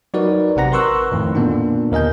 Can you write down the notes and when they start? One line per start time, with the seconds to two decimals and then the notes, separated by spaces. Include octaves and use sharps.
0.14 F#3 D#4 F#4 A#4 B4 D5
0.56 A1 C3 C4 F#5 A#5 A#6
0.72 A#4 B4 C6 C#6 E6 F#6
1.12 F2 A2 D#3
1.35 A#2 D3 A#3 B3 D4 F4
1.92 D#2 A#4 D#5 G#5 G6